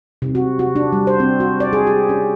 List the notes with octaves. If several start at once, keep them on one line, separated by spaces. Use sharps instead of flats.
C3
F#4
F#4
D4
G3
C5
C4
F#4
D5
G#4
G4
C#4